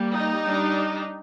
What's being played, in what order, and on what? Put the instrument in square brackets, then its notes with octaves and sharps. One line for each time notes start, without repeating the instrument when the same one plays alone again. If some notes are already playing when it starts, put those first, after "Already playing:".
Already playing: [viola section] G3 A#3
D#4
G3 D4